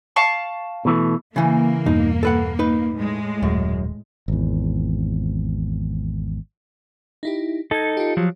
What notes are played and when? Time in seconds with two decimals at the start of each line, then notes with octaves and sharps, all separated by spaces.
0.16 F5 A5 C#6
0.85 B2 E3 A3
1.36 C#3 E3 A#3
1.86 E2 G2 B2 D#4
2.23 A4 B4 F#5
2.59 D#4 B4
2.95 A2 G#3
3.43 D#1 F#2
4.28 G#1 E2
7.23 D#4 E4 G4
7.71 D#4 A4 G#6 A#6
7.97 F4 G4
8.17 F3 F#3